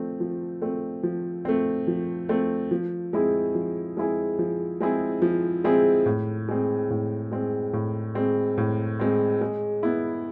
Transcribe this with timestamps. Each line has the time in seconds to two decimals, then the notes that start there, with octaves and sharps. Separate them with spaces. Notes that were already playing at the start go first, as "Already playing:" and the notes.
Already playing: F3 A3 C4
0.20 F3
0.62 A3 C4
1.03 F3
1.45 A3 C4
1.87 F3
2.29 A3 C4
2.71 F3
3.13 G#3 C4 E4 G#4
3.55 F3
3.97 G#3 C4 E4 G#4
4.39 F3
4.80 G#3 C4 E4 G#4
5.22 F3
5.64 G#3 C4 E4 G#4
6.06 A2
6.48 G#3 C4
6.90 A2
7.32 G#3 C4
7.73 A2
8.15 G#3 C4
8.58 A2
9.00 G#3 C4
9.41 G#3
9.83 B3 E4